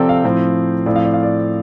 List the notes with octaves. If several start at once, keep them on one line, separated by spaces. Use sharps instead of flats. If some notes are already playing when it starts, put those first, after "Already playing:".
Already playing: C3 F3 C4 A4 D5 G5
F5
A2 F3 C4
A2 F3 C4 D5
F5
D5
F5
D5